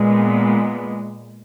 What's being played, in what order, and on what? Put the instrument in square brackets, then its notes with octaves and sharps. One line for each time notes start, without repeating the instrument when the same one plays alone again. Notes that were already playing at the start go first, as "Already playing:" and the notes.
Already playing: [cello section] A#2 G#3 B3